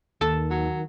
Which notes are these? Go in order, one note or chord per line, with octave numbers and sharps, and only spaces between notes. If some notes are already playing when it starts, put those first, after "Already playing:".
D#2 D#3 A4 A5
F#3